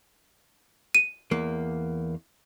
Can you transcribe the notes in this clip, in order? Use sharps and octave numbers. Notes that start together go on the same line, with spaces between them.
D#7
E2 A#3